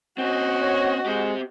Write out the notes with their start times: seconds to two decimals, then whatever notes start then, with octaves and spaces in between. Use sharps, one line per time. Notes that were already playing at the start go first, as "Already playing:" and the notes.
0.18 C4 C#4 F#4 D#5
0.62 C#5
1.06 G#3 C4 G4